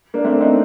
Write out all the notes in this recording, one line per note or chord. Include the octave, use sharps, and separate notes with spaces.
A#3 D4
A3 C4
C4 D#4